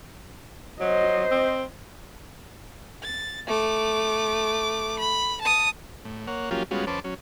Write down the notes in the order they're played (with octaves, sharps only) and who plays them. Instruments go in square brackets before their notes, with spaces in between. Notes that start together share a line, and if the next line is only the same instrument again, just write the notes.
[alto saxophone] F#3 [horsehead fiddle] C5 D#5
[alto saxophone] C4
[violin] A6
A3 D6
B5
A5 D#6
[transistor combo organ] A2
A#3 C#5 F#5
F3 F#3 A#3 C#4 F4 G4
G3 G#3 B3 C#4 F4 F#4
F2 C#4 B4 C5 A5 D6
F#3 C#4